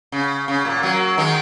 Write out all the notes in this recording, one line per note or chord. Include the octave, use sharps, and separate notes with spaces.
C#3
C#3
A#2
F#3 A#3
D#3 G#3